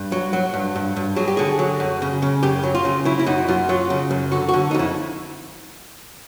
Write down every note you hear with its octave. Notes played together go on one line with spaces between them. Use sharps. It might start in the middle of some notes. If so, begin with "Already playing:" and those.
Already playing: G2
F#3
F#3
G2
G2
G2
F#3 G#4
G4
D3 G#4
F#3
F#2
C#3
C#3
F#2 G4
F#3
F4
C#3
F#3 E4
E4
F#2 D#4
F#2 F4
F#3 F4
C#3
F#2
D3 F#4
F#4
D3
D#4
F2 E4